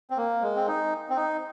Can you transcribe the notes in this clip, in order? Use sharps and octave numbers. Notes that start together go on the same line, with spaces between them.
C4
A#3
G#3
C4
D#4
C4
D#4